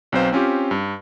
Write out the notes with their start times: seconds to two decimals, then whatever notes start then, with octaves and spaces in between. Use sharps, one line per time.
0.12 B1 F#3 C4 B4 C5 F5
0.32 C4 C#4 F4 G4
0.71 G2